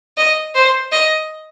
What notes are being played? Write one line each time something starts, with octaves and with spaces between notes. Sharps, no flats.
D#5
C5
D#5